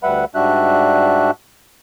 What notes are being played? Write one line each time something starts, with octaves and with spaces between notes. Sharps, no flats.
D2 G3 B4 E5 F#5 B5
G#2 G3 D4 F#4 E5 F#6